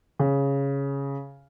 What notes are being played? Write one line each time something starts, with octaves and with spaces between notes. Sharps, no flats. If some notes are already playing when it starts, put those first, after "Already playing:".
C#3